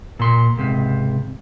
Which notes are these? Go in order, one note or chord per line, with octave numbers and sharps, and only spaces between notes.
A#2 C6
C#2 G#2 C3